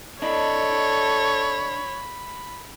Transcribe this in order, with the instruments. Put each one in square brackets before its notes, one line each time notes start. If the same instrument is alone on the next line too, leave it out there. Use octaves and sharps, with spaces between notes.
[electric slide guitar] D4 D#5 [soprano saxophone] A4 [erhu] C#5 [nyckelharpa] B5